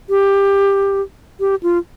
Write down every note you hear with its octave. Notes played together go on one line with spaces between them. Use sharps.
G4
G4
F4